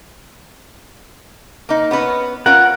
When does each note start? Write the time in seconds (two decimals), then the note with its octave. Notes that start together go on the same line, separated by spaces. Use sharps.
1.69 A#3 D#4
1.91 B3 C#4 B4
2.46 C#4 F4 A#4 F#5